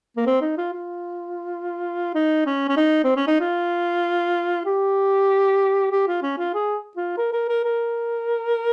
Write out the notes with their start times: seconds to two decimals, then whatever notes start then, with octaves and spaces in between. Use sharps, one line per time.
0.17 A#3
0.26 C4
0.41 D#4
0.58 F4
0.73 F4
2.15 D#4
2.46 C#4
2.68 C#4
2.77 D#4
3.04 C4
3.16 C#4
3.27 D#4
3.40 F4
4.66 G4
5.91 G4
6.08 F4
6.22 C#4
6.38 F4
6.54 G#4
6.97 F4
7.18 A#4
7.33 A#4
7.49 A#4
7.65 A#4